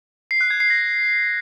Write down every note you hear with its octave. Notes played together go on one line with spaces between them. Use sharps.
C7
F#6
G#6
C7
A#6